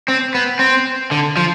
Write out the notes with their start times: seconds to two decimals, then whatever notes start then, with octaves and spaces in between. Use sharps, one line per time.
0.08 C4
0.35 B3
0.59 C4
1.11 D3
1.37 F3